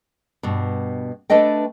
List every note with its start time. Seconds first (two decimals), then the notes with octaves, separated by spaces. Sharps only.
0.43 G2 B2
1.30 A3 D4 B4 D#5 G5